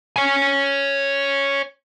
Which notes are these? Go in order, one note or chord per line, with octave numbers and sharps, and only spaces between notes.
C#5 G#5